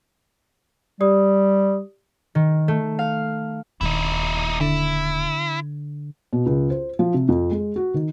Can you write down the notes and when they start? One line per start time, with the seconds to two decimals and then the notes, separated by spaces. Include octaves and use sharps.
1.01 G3 G4 D5 D#6
2.35 D#3
2.68 A3
2.99 F5
3.81 D#1 D#2 D#4 E4
4.61 D3 E4
6.33 B2
6.46 C#2
6.70 C5
6.99 F3
7.14 C3
7.29 F2
7.51 G#3
7.76 F#4
7.94 D#3